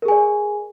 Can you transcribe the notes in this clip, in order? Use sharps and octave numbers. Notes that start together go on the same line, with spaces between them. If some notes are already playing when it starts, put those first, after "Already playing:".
G#4 A#4 D5 G#5